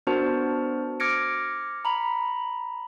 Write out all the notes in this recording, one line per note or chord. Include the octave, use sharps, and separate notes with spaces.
B3 D4 F#4 A#4 C5 A5
D6 F6 G#6 A#6 C#7 D7
A#5 B5